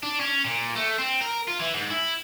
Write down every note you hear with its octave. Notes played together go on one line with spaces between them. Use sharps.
D4
C#4
A#2
A3
C4
A#4
F4
E3
G#2
E4